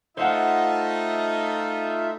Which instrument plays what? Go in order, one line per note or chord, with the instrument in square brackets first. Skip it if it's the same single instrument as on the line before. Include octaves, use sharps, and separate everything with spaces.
[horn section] A3 D#4 [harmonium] F4 E5 [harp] C5 F#5